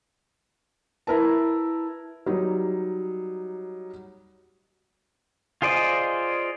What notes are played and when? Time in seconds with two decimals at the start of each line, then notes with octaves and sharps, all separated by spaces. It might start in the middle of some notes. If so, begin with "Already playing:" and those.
1.07 E4 A#4 B4 A5
2.26 F#3 G3 D#4
5.62 F4 G#4 C5 D5 D#5